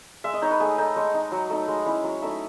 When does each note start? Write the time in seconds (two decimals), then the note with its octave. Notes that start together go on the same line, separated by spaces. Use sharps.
0.24 G#3 E5
0.34 D#5
0.42 D#4 C#5
0.51 B4
0.60 A3 G#4
0.78 D#4 A4
0.96 G#3 C#5
1.14 D#4
1.32 F#3
1.50 A3 D#4
1.68 G#3 D#5
1.86 C#4 E4 C#5
2.04 F#3 C#5
2.22 A3 D#4 E5